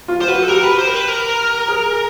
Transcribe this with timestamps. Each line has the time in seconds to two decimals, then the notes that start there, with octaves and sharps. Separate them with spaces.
0.08 F4
0.21 C5
0.28 F#4 B4
0.42 A4
0.48 G4 A#4
0.63 B4
0.78 C5
0.88 A#4
0.94 B4
1.08 A#4
1.68 G#4